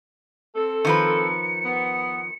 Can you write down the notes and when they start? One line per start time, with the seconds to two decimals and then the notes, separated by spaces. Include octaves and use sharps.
0.56 C4 A4
0.85 D#3 F3 B4 C#7
1.65 B3